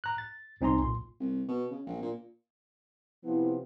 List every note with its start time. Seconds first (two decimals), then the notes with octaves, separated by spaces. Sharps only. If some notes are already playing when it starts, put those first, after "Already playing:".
0.04 A#5 F#6
0.18 A6
0.61 C2 C4 D#4 G#5 A#5 C6
0.79 B1 A#2 C6
1.20 C2
1.48 B2
1.70 C#3
1.86 A#1
2.02 A#2
3.24 C3 F3 B3 E4